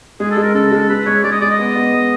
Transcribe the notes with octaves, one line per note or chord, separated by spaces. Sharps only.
G#3 G#4
A4
G#3
A#4
C#3 A4
G#3
G#3 B4
G#3 C#5
G#3 D5
D#5
G#3 D5
D#5
B3
B3
G#3